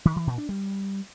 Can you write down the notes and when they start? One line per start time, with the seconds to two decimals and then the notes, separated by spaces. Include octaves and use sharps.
0.05 D#3
0.16 E3
0.27 A#2
0.38 D4
0.49 G3